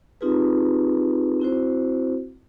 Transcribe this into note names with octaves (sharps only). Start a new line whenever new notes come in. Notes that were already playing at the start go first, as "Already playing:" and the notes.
C4 D#4 F4 G4 G#4 B4
C4 E4 F#4 C5